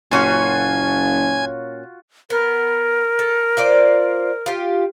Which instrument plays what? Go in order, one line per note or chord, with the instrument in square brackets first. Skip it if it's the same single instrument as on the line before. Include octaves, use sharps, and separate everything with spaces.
[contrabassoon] F#1 [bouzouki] A#2 C#4 F5 [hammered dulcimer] F4 F#4 [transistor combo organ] G#5
[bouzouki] B3 [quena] A#4
[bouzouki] A4
F4 C5 D5
F4 G4